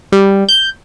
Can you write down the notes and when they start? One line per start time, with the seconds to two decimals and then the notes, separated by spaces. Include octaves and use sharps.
0.12 G3
0.49 G6